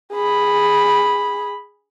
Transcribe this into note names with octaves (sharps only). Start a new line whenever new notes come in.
G#4 B5